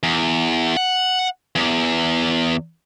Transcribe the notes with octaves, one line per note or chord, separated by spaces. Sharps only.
E2
F#5
E2